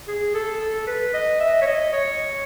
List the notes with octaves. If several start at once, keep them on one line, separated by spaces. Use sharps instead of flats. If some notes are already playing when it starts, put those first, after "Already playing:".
G#4
A4
A4
B4
D#5
E5
C#5
D#5
C#5